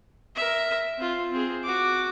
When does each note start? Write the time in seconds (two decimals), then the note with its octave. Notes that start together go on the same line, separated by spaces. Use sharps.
0.35 A#4 E5
0.97 C4 F4
1.31 C4 G#4
1.64 F#4 D6